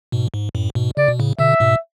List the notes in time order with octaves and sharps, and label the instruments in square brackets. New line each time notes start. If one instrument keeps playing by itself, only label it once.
[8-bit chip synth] G#2 B2
G#2
F#2 A2
G#2 B2
[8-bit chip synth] C#3 [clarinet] D5
[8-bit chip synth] B2
A2 C#3
[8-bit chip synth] B2 D3 [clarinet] E5
[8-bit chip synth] G#2 B2